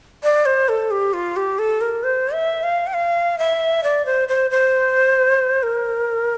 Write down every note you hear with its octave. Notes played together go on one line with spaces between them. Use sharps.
D5
C5
A4
G4
F4
G4
A4
A#4
C5
E5
F5
G5
F5
E5
D5
C5
C5
C5
A#4